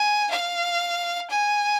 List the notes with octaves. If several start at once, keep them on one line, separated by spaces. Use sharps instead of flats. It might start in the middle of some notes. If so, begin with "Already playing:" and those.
Already playing: G#5
F5
G#5